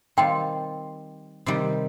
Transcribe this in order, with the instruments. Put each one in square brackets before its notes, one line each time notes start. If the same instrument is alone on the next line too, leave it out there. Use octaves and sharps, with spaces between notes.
[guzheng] D#3 G3 C4 F4 [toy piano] G5
[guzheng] C3 D#3 G3